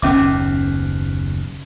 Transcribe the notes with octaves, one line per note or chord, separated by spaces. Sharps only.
F#1 D#2 B2 C#4 E5 D6